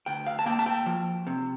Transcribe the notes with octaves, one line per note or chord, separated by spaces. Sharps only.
D2 G5
F5
A5
A#3 G5
A5
G5
F3
C3